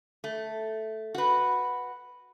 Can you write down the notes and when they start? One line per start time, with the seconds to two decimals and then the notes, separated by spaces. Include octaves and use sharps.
0.24 A3
1.15 F#4 B4